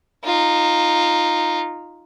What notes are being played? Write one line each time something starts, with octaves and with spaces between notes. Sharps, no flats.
D#4 F4